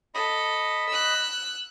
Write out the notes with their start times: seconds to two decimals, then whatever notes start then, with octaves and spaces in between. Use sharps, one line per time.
0.15 A4 D#5 B5
0.88 E6 F#6